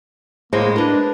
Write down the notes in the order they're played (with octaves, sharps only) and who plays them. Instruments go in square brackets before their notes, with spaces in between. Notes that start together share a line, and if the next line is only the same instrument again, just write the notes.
[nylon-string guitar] A2 G#3 C4 [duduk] A#3
[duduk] D4 [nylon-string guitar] A#4 B4